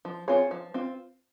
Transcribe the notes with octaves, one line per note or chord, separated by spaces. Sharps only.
F3
C4 F4 G#4 C#5
F3
C4 F4